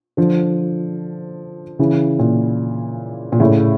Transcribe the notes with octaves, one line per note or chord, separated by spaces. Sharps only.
D3 F3
C#3 E3
A#2
A#2
A2 C#3